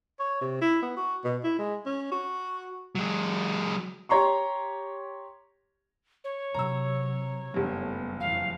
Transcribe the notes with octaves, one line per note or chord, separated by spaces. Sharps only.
C#5
C3
E4
B3
F#4
B2
E4
G#3
C#4
F#4
F#3 G#3
G4 C#5 A#5 C6 C#6
C#5
C3 F#3 A#5 E6
F#1 G2 F#3 A3 B3
F2 E3 F#3 F5